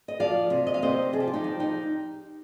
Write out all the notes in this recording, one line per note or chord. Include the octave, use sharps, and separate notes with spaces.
D#5
F3 D5 F5
C3
D#5
F5
C3 C5 D#5
F3 G#4
G4
F4
D#4 G4
F3
D#4 G4